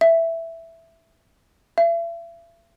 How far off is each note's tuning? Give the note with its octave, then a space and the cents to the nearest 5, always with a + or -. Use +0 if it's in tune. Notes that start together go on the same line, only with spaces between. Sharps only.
E5 +5
E5 +40